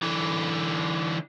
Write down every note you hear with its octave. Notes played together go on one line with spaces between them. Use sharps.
D3 E3